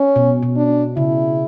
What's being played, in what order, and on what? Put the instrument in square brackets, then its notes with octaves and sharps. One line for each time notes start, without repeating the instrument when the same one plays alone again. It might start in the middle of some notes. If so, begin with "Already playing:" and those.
Already playing: [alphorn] C#4
[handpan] B2
B2
[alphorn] D4
[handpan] C#3 [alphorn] E4